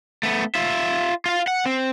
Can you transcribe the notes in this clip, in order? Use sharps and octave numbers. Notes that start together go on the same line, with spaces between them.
A3 B3
F4 E5
F4 F5
F#5
C4